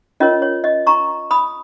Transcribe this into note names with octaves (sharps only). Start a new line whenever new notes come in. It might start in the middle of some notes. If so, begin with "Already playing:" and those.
C#4 F4 A#4 C#5 D#5
C#5
D#5
A#5 C#6
B5 D#6